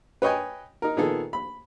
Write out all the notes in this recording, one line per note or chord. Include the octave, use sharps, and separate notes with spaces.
B4 C#5 D#5 G5 G#5
D#4 A#4
A#2 D#3 B3 G#4 A4
B5